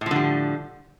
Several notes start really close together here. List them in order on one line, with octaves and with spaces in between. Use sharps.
A2 F3 D3 G3